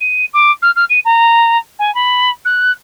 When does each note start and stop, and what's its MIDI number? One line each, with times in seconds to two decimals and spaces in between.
0.01 0.25 99
0.34 0.52 86
0.62 0.71 89
0.76 0.85 89
0.90 1.00 99
1.05 1.58 82
1.79 1.93 80
1.95 2.30 83
2.45 2.72 90